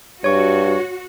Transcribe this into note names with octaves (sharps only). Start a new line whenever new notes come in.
G2 F#4 C#5 C#6